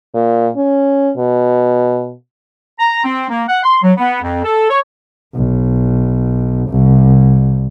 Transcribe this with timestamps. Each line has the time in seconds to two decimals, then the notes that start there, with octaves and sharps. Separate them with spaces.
0.14 A#2
0.56 C#4
1.17 B2
2.79 A#5
3.04 C4
3.29 A#3
3.48 F#5
3.64 C6
3.83 F#3
3.97 B3
4.22 F2
4.44 A4
4.69 C#5
5.36 B1
6.70 C2